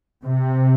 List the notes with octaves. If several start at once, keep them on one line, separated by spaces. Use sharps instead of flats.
C3